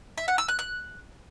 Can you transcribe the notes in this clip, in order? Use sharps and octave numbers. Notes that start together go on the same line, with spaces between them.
E5
F#5
E6
F#6
F#6